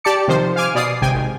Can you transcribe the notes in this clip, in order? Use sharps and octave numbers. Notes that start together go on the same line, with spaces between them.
G4 D5 A5 D6 C#7
C3 D#3 F3 C5
F5 G#5 D6 F6
B2 D5 D#6 C7
G#1 C3 G5 G#5
G#1